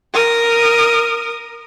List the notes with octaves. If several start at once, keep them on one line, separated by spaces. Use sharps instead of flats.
A#4 D#6